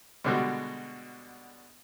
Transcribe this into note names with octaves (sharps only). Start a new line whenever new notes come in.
B2 D3 G3 G#3 F#4